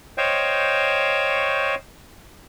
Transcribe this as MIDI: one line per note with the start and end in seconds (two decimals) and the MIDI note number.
0.18 1.75 72
0.18 1.75 73
0.18 1.75 75
0.18 1.75 77
0.18 1.75 79
0.18 1.75 85